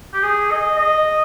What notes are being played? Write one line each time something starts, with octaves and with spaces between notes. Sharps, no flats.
G4
G#4
D#5
D#5